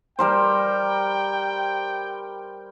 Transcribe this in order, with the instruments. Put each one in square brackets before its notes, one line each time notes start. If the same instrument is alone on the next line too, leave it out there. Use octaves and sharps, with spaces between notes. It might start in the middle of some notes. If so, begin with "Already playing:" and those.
[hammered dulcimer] G3 A#4 C5 [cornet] G5